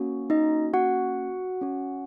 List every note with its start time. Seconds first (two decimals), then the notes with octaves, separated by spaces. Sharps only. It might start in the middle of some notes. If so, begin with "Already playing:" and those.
Already playing: A#3 C#4 F#4
0.30 D#4 D#5
0.74 F#4 F#5
1.61 C#4 F#4